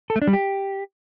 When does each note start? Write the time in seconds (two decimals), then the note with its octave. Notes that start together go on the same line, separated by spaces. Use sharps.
0.10 A4
0.16 A3
0.22 D4
0.27 G3
0.33 G4